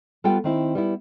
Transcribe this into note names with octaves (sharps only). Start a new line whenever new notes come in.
G3 B3 F4 A4 F#5 G5
D#3 C4 E4
G3 B3 E4